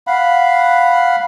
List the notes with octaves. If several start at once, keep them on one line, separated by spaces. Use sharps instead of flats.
F5 F#5 B5